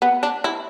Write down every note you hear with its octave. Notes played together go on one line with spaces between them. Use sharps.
B3
D4
E4